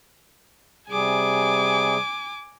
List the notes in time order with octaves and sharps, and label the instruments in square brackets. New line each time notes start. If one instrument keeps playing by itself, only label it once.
[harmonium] C3 G3 G#4 [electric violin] G#5 D6